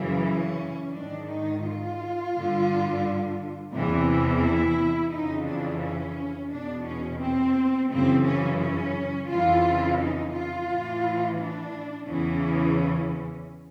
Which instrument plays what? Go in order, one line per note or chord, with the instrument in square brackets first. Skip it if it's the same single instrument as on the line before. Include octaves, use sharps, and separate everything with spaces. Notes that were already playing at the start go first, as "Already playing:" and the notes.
Already playing: [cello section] F#2 C#3 E3
C#4
G#2 D#3 D4
D#4
F4
G2 D3
E2 C3 E3
E4
F2 C#3 E3 D#4
D4
C#4
E2 B2 D4
C#4
C4
F#2 C#3 E3 C4
C#4
C#4
F2 C#3 E3 F4
D#4
F4
A2 E3
D4
E2 C#3 E3 C#4